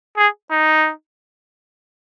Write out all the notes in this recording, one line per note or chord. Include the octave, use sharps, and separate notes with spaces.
G#4
D#4